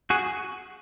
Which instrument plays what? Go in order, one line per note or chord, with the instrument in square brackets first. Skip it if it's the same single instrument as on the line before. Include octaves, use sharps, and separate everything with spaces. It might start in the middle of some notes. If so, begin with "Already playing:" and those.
[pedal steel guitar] F#4 G#4